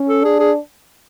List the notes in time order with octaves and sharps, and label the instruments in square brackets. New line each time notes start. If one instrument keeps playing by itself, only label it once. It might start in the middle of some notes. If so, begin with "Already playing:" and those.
Already playing: [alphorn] C#4
[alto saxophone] A4
[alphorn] D4 [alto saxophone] G#4
[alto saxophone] G#4